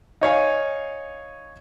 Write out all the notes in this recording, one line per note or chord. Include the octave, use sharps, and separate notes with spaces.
D#4 C#5 F5 G#5